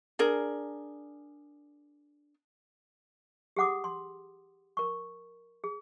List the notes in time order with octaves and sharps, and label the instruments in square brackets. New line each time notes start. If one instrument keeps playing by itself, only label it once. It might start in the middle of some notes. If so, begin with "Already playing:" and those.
[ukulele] D4 G#4 A#4
[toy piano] G4 G#4 F#5 D6 D#6
C6
A#4 C#6
G#4